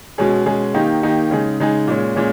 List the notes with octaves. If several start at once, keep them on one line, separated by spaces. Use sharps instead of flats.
B2 G#3 C#4 G#4
B2 G#3 C#4 G#4
D#3 A#3 D#4 G4
D#3 A#3 D#4 G4
C#3 G#3 D#4 G#4
C#3 G#3 D#4 G#4
A#2 G#3 C#4
A#2 G#3 C#4